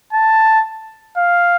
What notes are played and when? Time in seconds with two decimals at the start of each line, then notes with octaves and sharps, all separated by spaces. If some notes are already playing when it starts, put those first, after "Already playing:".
0.13 A5
1.17 F5